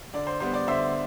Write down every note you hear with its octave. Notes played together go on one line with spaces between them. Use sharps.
D3 D5
C5
G3 B3 C5
D5
D3 C5 E5